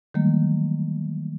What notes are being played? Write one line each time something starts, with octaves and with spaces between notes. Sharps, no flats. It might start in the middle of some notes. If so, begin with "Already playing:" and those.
D#3 E3 F#3 G3 A3 A#3